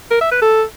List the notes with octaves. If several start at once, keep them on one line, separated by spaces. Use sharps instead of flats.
A#4
E5
B4
A4